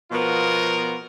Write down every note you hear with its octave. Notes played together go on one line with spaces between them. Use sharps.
B2 F3 B3 F4 A#4